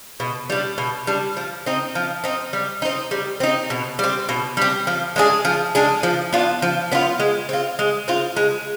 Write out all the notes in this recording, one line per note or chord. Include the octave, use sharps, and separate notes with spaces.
B2
G3 D4
B2
G3 D4
F3
C4 D#4
F3
C4 D#4
G3
C4 D#4
G3
C4 D#4
B2
G3 C4
B2
G3 C4
F3
G#3 D4 G#4
F3
G#3 D4 G#4
F3
B3 D4 F4
F3
B3 D4 F4
G#3
C4 F4
G#3
C4 F4
G#3